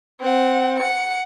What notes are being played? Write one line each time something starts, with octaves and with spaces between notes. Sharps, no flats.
C4 F#5
F#5 C#7